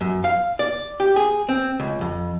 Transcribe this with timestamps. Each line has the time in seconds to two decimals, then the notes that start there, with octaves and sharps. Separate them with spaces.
0.01 F#2
0.24 F5
0.59 D5
1.00 G4
1.16 G#4
1.49 C4
1.80 C#2
2.01 F2